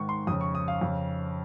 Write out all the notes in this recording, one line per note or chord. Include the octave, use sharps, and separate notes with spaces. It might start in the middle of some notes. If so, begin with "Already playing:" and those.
Already playing: G#2 D#3 C#6
C6
F2 C#3 D#6
C#6
D#6
F5
F2 C#3